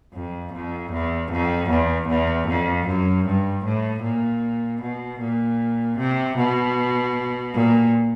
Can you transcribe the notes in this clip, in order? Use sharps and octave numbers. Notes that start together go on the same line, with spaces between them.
F2
F2
E2
F2
E2
E2
F2
F#2
G2
A2
A#2
B2
A#2
C3
B2
A#2